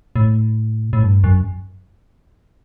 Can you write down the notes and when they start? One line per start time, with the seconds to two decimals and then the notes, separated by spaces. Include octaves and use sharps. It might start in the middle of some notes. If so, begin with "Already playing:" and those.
0.16 A2
0.93 A2
1.03 G2
1.24 F#2